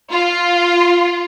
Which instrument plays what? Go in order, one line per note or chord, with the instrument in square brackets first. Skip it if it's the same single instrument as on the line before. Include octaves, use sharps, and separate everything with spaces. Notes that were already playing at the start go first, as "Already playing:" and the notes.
[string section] F4